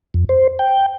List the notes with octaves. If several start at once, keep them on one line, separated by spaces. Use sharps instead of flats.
F2
C5
G5